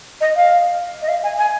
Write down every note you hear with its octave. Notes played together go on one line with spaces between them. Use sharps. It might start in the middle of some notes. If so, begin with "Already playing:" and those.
D#5
F5
D#5
F5
G#5
G#5